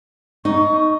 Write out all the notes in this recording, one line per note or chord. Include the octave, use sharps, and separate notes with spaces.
D#4 C#6